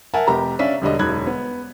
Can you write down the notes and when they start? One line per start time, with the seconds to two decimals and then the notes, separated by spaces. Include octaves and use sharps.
0.14 A#4 E5 F#5 G#5 A5
0.27 F1 G4 A#5
0.59 C#4 D4 D5 E5 F5 B6
0.82 E1 D3 G3 D#5
0.99 E1 F#2 D#4 B5 F#6 G#6
1.27 B3